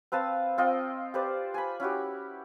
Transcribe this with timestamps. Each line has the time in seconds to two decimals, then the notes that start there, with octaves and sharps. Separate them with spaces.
0.12 C4 B4 F5 A5
0.58 C4 F4 D#5 G5
1.14 G4 B4 C5 D5
1.54 G#5 B5
1.80 C#4 E4 F#4 G4